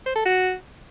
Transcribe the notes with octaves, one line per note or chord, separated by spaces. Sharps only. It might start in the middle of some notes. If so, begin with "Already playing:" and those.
C5
A4
F#4